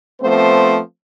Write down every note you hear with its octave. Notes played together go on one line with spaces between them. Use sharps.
F3 A3 B3 C4 C5